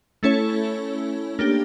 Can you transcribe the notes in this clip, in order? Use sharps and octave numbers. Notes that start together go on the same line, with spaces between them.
A3 C#4 E4 A4 C#5
A#3 D4 G4